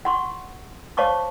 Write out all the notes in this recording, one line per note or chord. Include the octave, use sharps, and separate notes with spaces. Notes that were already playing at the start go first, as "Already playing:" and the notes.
F#5 C6 C#6
C5 C#5 F5 A5 C#6 D6